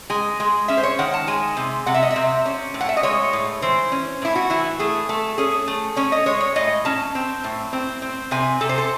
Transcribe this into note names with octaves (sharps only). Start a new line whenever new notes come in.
G#3 G#5
G#3
C#4 E5
C5
C#5
D#3 F#5
A5
G#3 G#5
C3
C3 F#5
E5
D#5
E5
C3
C#4
A2
F#5
E5
D#5
G#3 C#5
A2
E3 C5
C#4
A2 E4
F#4
E3 E4
A3 G#4
A3 A4
C#4 G#4
A3
C#4 C#5
D#5
G#3 C#5
C#5
A2 D#5
C#4 A5
C4
A2
C4
C4
C3 G#5
C3 A4
C5
A4